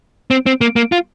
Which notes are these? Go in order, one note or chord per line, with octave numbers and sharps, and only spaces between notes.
C4
C4
A#3
A#3
F4